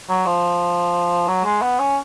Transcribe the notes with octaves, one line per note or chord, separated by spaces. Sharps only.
F#3
F3
F#3
G#3
B3
C#4